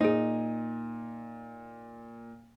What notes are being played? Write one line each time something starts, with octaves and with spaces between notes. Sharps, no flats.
A#2 D#4 G#4 C5